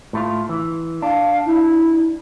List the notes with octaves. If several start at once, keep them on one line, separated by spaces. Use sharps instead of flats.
A2 A3 F4
E3
D4 F5
E4